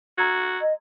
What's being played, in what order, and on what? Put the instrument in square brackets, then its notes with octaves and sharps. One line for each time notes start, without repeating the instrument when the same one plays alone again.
[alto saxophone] F#4 [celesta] A#5 E6 G#6
[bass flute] D#5